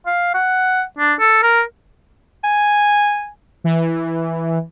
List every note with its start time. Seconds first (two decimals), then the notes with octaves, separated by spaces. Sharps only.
0.06 F5
0.34 F#5
0.98 D4
1.19 A4
1.43 A#4
2.44 G#5
3.64 E3